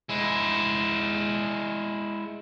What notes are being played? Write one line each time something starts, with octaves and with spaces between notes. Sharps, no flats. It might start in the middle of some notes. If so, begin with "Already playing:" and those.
G#3 E4